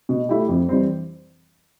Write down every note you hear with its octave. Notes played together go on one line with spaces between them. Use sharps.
B2
A3 E4 G4
F2
E3 G3 C4